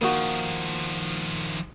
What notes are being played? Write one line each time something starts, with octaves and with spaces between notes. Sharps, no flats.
D#3 F3 A#3 D#4 F#4